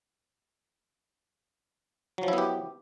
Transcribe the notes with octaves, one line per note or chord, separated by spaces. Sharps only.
F3 F#3 B3 E4 G4